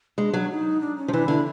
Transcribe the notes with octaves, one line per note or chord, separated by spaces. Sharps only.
G#3 D4
F#3
D#4
D4
C#4
F3
E3 D4
D3 E4